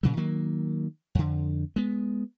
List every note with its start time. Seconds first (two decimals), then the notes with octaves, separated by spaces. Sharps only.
0.03 A#2 C#3 F#3
0.17 D#3 F#3 A#3
1.15 F2 D3
1.76 G#3 B3